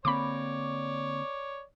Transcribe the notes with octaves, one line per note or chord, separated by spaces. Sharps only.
D3 A#3 C4 C#5 D5 B5 D6